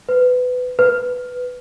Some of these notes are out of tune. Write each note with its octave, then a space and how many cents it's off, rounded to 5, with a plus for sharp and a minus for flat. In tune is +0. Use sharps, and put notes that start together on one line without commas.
B4 +20
B4 +5